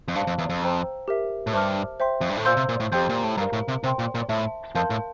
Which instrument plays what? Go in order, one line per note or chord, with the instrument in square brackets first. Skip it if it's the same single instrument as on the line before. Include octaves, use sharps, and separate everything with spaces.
[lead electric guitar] F2
[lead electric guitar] G2 [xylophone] C5 F5 A5
[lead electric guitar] F2
E2
F2
[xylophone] C5 G5 A#5 E6
G4 A#4 E5
[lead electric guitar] A2
[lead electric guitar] G2 [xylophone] C5 E5 A5 D6 F6
[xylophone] C5 E5 G5 C6
[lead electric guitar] F2
G2
A2
[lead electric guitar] A#2 [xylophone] C5 F5 C6 E6 G6
[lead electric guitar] C3
A#2
A2
[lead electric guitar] F2 [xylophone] G4 C5 G5 C6 G6
[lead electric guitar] A#2
A2
[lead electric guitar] G2 [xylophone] A#4 F5 A#5
[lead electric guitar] A2
C3
[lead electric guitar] C3 [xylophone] C5 G5 C6
[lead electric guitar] A#2
A#2
[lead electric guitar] A2 [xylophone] E5 A5 C6
[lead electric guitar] F2 [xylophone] A#4 F5 A5 C6 G6
[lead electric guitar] A2